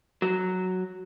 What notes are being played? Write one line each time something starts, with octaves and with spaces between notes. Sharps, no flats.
F#3